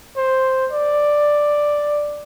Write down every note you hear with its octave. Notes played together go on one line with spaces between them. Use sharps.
C5
D5